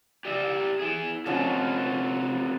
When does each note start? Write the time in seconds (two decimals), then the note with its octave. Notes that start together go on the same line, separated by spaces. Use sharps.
0.25 G4 D5 E5
0.80 E4 G#4
1.26 F3 C4 C#4 D#4 F#4 A4